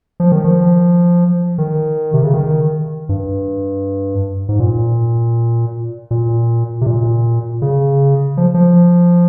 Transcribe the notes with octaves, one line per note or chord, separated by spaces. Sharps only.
F3
D#3
F3
D#3
C3
C#3
D#3
G2
G#2
A#2
A#2
C3
A#2
C#3
F3
F3